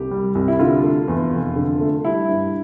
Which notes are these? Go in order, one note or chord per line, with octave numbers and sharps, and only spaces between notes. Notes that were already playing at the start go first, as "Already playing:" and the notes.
Already playing: C2 G4
G3
C2
E4
D3 F4
A3
E2
F1
D3
A3
G3 E4
G2